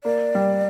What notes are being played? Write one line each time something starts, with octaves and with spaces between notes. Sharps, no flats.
A#3 D5
G3